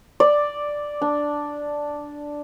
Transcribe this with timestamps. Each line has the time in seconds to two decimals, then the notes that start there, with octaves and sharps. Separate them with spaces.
0.20 D5
1.02 D4